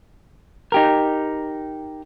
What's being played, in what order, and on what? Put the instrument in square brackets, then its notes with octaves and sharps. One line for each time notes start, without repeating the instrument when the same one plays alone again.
[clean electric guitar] D#4 G4 A#4